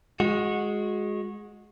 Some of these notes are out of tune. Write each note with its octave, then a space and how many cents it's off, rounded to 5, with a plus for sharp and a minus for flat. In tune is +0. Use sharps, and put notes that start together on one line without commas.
G#3 +0 F#4 -20